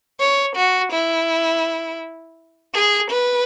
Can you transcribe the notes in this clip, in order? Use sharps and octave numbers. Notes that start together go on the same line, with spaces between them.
C#5
F#4
E4
G#4
B4